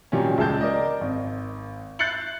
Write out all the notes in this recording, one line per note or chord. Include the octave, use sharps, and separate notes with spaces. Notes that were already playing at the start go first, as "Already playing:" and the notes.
A#2 D#3 F#3 G3 C#4
C#2 G#3 A5 G6
A#4 D5 D#5
G#1
F#6 G6 A6 C7 C#7 F#7